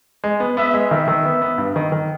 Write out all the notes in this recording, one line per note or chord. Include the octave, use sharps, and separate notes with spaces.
G#3
B3
B3 E5
G#3
D#3 E5
D#3
B3
B3
G2
D#3
D#3